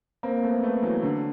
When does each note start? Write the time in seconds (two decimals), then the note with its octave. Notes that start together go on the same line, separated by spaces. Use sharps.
0.23 A#3 C4
0.43 A3 B3
0.62 A3 B3
0.83 E3 F#3
1.03 D3